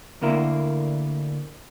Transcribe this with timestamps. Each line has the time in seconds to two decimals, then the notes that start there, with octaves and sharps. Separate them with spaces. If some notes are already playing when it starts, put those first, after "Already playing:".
0.21 D2 D3 A#3 E4 A#4